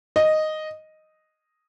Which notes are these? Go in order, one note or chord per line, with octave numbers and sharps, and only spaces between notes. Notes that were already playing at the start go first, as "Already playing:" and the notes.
D#5